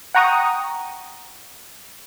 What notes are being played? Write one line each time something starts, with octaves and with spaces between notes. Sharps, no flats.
F#5 G5 A#5 C#6 D#6